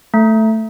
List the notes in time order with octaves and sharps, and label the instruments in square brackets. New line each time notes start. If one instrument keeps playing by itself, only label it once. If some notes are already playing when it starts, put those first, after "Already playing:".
[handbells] A3